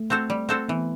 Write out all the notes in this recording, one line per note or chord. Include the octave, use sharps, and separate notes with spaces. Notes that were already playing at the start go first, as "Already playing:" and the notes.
Already playing: A3
C4 F#4 A4 C5
G3
C4 F#4 A4 C5
E3 B3